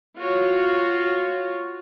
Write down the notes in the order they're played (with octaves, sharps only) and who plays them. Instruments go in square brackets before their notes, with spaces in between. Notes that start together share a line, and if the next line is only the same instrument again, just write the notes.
[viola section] F4 F#4 C#5